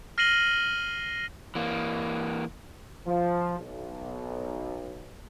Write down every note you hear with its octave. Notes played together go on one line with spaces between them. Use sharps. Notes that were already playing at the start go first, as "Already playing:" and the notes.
F6 A#6 C7 D#7 F#7 G7
E3 A#3
F3
B1